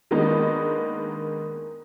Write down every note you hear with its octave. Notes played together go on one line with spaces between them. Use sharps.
D#3 G#3 A#3 B3 D4 D#4